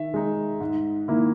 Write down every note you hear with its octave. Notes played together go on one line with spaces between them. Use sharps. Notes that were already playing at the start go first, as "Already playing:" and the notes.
Already playing: D#3 E5
G#3 D#4
G#2
D#3 A#3 E4